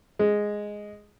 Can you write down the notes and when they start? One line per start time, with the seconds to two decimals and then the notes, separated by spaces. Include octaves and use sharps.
0.19 G#3